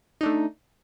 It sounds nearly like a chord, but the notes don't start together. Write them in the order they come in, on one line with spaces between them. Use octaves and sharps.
D#4 D4 A3